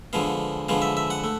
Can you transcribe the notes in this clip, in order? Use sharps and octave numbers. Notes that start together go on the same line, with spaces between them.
D3 F3 G#3 B3 F5
D3 F3 G#3 B3 F5
E5
E5
F#5
A3